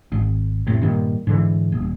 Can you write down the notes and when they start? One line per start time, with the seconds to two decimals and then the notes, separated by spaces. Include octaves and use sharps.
0.12 G#1
0.67 F1 A2 C3
0.82 G2 A#2 D#3
1.27 G#2 D3 E3
1.72 D#1